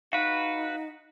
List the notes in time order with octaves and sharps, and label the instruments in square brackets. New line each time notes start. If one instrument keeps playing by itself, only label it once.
[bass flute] D#4 [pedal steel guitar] F#4 B4 [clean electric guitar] F5